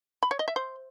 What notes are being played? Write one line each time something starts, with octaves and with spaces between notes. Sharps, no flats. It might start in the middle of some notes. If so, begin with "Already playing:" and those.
B5
C#5
D#5
E5
C5